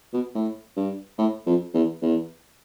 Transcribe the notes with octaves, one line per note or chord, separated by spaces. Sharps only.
B2
A2
G2
A2
F2
E2
E2